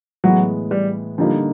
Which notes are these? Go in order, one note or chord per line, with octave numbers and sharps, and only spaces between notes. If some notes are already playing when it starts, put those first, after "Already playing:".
A2 E3 F#3 G#3 B3
G3
D3 F3 G3 A#3 D#4